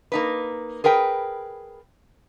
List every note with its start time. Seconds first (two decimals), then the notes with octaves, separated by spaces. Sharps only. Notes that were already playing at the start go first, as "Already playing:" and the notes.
0.12 A#3 D#4 B4
0.84 G#4 A#4 B4 G5